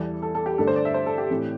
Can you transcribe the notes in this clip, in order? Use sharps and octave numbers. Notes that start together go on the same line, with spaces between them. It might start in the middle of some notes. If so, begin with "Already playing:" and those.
Already playing: E2 E3 G3 A4
A4
A4
G4
G2 D3 A3 D4 A4
C5
D5
E5
C5
A4
G4
A2 E3 C4